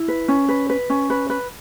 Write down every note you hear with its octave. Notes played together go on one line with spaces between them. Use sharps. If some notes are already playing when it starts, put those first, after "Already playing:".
Already playing: E4
B4
C#4
B4
B4
C#4
B4
B4